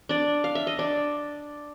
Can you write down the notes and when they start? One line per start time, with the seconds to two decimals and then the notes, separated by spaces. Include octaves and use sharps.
0.09 D4 D5
0.44 F5
0.55 E5
0.67 D#5
0.79 D4 D5